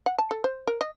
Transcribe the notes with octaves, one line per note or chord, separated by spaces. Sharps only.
F#5
A5
A4
C5
A#4
D#5